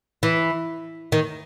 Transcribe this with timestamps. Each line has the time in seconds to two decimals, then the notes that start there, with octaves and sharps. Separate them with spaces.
0.23 E3
1.12 D#3